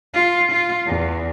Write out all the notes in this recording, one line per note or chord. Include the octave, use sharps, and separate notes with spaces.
F4
F4
E2